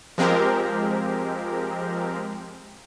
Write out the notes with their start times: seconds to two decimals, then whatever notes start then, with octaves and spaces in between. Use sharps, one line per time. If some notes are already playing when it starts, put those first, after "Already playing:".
0.18 F3 G#3 C4 G4 A#4